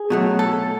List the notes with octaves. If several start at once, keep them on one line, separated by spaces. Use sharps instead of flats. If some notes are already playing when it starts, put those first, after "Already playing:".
Already playing: G#4
B2 F#3 A3
A4